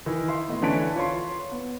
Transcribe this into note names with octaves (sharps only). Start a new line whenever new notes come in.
D#3 E3 E4
E5 C6
A2 B3 D#5
D3 E3 C#4 A5 B6 D7
F4 C#5 C6
B3